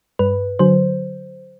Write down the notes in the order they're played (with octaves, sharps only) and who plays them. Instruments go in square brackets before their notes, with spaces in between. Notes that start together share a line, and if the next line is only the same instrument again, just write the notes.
[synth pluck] G2 B4
D3 F#3 C5